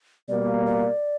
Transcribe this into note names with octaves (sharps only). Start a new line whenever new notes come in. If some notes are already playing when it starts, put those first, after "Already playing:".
B2 G3 A#3 D5
D5